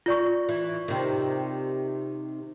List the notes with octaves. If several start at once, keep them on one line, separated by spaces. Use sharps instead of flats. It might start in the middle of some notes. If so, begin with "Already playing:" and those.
F4 D5 C#6
E3
C3 D#3